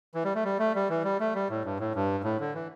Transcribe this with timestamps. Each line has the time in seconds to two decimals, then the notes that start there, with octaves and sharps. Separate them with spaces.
0.14 E3
0.24 G3
0.35 A3
0.44 G3
0.59 A3
0.75 G3
0.89 E3
1.04 G3
1.20 A3
1.35 G3
1.49 A2
1.65 G2
1.79 A2
1.95 G2
2.24 A2
2.40 D3
2.54 E3